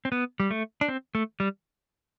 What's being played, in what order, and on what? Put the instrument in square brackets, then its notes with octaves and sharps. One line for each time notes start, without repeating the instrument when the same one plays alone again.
[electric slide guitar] C4
B3
G3
A3
D4
C4
A3
G3